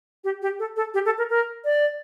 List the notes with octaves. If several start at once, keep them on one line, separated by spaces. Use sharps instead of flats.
G4
G4
A4
A4
G4
A4
A#4
A#4
D5